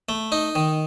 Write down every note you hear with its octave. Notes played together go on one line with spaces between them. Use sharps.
A3
D#4
D#3